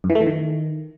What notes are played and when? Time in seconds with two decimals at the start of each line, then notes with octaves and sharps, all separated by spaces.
0.04 F#2
0.10 E3
0.15 A3
0.21 E3
0.27 D#3